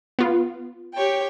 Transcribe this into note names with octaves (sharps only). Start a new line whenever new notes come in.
B3 F4
G4 C#5 G5